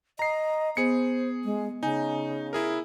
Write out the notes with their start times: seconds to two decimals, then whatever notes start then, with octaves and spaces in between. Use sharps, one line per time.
0.19 D#5 A#5 C7
0.77 B3 G#4 C5 C#7
1.44 G#3
1.83 C#3 D#4 G#5
2.53 E4 G#4 A#4